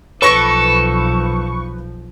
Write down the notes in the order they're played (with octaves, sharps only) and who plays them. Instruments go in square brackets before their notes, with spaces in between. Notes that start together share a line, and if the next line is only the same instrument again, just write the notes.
[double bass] B1 F3 [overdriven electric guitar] A4 [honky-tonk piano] B4 A#6 D7 [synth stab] C#6